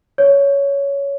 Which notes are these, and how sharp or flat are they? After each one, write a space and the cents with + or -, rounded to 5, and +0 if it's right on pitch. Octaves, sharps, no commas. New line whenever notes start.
C#5 +15